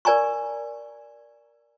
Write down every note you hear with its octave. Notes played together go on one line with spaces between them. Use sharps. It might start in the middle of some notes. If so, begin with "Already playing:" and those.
A#4 D5 G#5 A#5 C#6